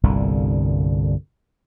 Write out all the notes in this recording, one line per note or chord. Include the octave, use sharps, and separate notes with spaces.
G1 C2 A#2 D3